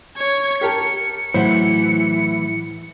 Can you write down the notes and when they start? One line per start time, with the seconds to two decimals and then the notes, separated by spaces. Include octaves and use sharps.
0.18 C#5 G#6
0.61 G4 A#4 A5 C#7
1.34 A2 E3 F#3 C5 F#5